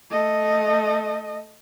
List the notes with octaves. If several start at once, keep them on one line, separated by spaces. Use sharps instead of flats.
A3 D#5